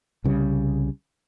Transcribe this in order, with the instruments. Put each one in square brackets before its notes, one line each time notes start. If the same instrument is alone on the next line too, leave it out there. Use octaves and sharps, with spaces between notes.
[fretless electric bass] C2 C#3 G3